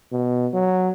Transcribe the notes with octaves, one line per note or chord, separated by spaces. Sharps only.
B2
F#3